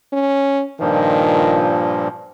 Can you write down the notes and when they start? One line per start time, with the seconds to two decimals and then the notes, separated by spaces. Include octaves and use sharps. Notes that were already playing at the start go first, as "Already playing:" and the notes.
0.13 C#4
0.80 G2 A#2 D#3 F3